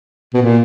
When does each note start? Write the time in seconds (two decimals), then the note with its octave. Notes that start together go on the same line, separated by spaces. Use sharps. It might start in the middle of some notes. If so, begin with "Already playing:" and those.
0.34 B2
0.42 A#2